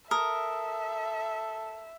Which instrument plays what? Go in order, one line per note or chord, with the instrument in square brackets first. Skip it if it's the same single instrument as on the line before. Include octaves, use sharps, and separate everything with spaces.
[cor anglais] A4 [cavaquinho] A#4 [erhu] E5 [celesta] D#6